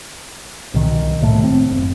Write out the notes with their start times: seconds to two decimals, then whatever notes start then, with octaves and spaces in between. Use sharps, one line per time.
0.74 C2 B2 D#3 E3
1.20 D1 C2 A2 A3
1.44 C4
1.70 F#1